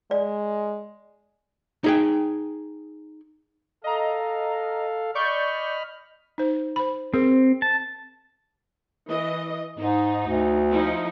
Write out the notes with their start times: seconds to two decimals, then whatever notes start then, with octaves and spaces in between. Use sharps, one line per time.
0.11 G#3 D5
1.84 D#4 G#4 G5
3.84 A4 D#5 F5 A#5
5.15 D5 D#5 B5 C#6 F6 G6
6.38 D#4 C5
6.76 C5 B5
7.14 C4 G#4 A#4 C5
7.62 A5
9.09 E3 D#5
9.78 G#2 D#4
10.27 D2
10.70 F3 D#4 E4